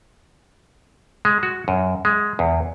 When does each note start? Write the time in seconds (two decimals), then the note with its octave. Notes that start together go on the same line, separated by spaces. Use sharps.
1.25 G#3
1.43 F#4
1.68 F#2
2.05 G#3
2.39 E2